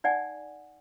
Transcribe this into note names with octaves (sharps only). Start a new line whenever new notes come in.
D#4 D5 F#5 G#5